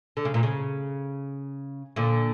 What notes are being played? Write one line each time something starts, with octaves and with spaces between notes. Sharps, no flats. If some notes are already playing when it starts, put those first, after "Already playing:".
D3
C#3
A#2
C#3
A#2 D3